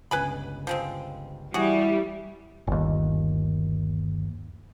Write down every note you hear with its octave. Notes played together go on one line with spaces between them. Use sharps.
G1 C#2 B4 G#5 B5
F3 G#3 C4
E3 G3 E4 F#4 G#4
G1 D#2